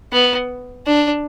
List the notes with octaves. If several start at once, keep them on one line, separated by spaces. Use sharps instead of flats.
B3
D4